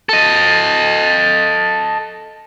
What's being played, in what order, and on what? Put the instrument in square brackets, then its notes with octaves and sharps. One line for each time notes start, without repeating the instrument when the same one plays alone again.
[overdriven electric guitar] A4 D#5